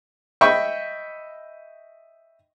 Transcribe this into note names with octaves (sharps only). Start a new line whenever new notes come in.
D#5 E5 G5 B5 C#6